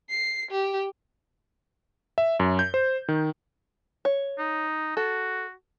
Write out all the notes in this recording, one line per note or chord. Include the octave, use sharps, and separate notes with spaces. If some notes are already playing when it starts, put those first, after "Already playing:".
C7
G4
E5
F#2
G6
C5
D#3
C#5
D#4
F#4 A4